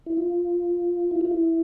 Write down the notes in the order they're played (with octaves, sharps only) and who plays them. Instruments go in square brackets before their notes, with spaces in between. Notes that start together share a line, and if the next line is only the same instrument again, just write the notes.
[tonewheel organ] E4
F4
E4
F4
E4